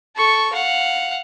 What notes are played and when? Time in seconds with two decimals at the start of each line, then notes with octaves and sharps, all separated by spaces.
0.16 A4 C#6
0.53 F5 F#5